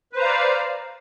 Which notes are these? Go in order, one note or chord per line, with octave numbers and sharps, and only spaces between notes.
B4 C5 D5 F5 A#5